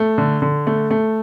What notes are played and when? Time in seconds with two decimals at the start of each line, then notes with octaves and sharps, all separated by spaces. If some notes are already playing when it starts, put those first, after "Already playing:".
Already playing: A3
0.18 D3
0.42 D3
0.67 A3
0.91 A3